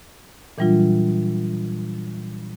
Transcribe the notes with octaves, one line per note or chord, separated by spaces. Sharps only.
A#2 E3 F#3 G3 D4 F4